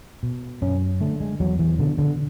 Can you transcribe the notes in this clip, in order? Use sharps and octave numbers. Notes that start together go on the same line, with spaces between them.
B2
F#2 C#4
D3 A3
G#3
E2 F#3
E3
B2 D3
D3